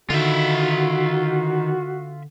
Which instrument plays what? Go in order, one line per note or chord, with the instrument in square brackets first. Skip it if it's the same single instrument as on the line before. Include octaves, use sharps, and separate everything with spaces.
[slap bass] D3 [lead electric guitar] D#3 [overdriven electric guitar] F4 E5 [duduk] F#4